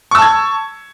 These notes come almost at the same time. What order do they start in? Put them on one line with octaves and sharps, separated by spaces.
C#6 E6 A5 G#6